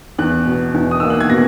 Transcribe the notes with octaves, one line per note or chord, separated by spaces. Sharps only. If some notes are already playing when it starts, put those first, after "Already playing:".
E2 F#6
B2
E2
D#6
A#3 E6
F#6
G#6
B2 A#6